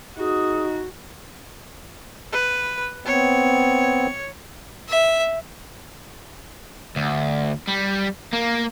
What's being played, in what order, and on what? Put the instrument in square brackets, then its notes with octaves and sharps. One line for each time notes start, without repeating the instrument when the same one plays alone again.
[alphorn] D#4 [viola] F#4 [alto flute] G#4
[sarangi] B4
[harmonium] B3 C4 [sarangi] C#5
[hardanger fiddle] E5
[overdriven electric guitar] D2
G3
A#3